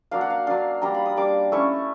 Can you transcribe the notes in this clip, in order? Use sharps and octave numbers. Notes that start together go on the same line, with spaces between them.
F#3 A#3 D4 F5
F#5
F5
F#3 A#3 D4 F5
G3 A#3 D4 A#5
B5
D#6
G3 A#3 D4 D6
A3 C#4 E4 C#6